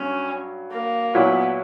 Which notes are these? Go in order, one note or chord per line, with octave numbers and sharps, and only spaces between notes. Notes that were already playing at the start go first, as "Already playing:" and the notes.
Already playing: G2 F#3 C#4
A#3
A#2 F#3 B3 C#4 E4